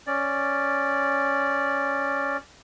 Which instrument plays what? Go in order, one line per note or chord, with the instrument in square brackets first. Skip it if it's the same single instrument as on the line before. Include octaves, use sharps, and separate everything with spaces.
[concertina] C#4 D5